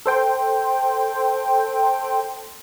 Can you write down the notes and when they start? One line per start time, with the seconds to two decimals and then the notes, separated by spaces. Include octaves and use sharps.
0.06 A4 C5 G5